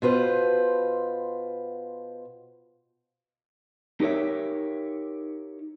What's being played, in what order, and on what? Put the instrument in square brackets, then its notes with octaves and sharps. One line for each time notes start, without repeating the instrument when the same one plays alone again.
[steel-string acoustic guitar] B2 F4 B4 C5
[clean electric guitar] D#4 G4 A#4 C#5 E5